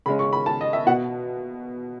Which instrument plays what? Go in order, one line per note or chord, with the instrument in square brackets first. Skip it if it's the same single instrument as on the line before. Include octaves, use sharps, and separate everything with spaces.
[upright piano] C#3 G#3 C#4 B5
C#6
B5
A5
D#5
E5
B2 F#5